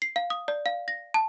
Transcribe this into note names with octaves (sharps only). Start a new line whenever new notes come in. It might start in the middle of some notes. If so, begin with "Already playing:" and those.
C7
F5
D#6
D5
F5
A#6
A5